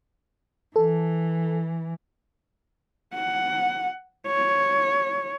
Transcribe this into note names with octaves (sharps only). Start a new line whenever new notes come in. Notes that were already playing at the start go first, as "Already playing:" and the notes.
E3 A4
F#5
C#5